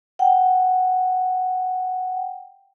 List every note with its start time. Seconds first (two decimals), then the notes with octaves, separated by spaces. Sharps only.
0.19 F#5 G5